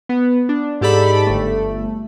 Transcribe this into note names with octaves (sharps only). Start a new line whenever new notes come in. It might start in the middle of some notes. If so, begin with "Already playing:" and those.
B3
D4
G#2 G4 A4 D5 B5
G1 A3